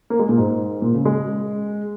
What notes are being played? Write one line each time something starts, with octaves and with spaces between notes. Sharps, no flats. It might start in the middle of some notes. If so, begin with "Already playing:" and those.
A#3
G#3
A#2
G#2
A#2
C#3
G#3